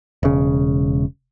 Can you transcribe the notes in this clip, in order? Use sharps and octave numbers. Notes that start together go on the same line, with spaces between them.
E1 C#3